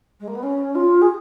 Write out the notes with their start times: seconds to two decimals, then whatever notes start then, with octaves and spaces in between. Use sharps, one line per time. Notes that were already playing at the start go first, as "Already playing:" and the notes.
0.20 G#3
0.28 A#3
0.35 B3
0.43 C#4
0.75 F4
1.01 G#4